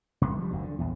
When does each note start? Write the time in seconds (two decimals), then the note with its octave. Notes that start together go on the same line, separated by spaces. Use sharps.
0.22 D1 G1 C2 C3
0.39 F3 G3
0.51 F#1 D2 F#3
0.63 D3
0.79 A#1 E2